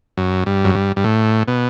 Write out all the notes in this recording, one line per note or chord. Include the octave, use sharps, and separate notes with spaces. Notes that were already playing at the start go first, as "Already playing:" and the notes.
F#2
G2
F#2
G2
G2
A2
B2